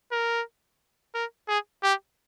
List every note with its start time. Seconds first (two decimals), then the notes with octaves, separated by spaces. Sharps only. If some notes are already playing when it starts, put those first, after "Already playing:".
0.12 A#4
1.15 A#4
1.48 G#4
1.83 G4